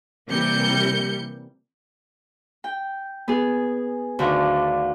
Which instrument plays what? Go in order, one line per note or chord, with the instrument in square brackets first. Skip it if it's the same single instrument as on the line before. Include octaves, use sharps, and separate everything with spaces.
[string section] C3 E3 G3 A#3 G6 C#7
[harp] G5
B3 G#4
D2 D3 D#3 F5